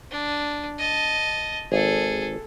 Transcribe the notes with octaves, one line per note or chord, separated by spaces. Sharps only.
D4
D#5 A5
G#1 G#4 A4